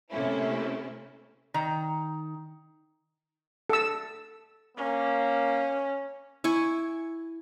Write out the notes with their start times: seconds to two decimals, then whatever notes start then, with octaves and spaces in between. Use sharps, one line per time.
0.11 C3 A3 A#3 C#4 E4
1.54 D#3 A#5
3.70 A4 E6
4.77 A#3 C#4
6.44 E4 G#5 C#6